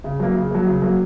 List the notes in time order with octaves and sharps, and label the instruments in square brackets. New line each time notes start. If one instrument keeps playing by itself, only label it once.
[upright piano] C#3
F#3 A#3
C#3
F#3 A#3
C#3
F#3 A#3